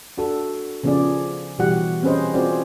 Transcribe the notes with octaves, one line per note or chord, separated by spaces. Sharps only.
D4 F#4 A4
C#3 F3 B3 F4 G#4 D5
B2 E3 G3 F#4 G4 F#5
C4 C#4 G#4 B4 C5 D#5
C4 F4 F#4 G#4 C5 D5